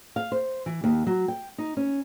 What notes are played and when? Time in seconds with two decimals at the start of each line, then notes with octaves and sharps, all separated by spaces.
0.16 F5
0.32 C5
0.66 E3
0.84 D#2
1.07 F#3
1.28 G5
1.58 D#4
1.77 C#4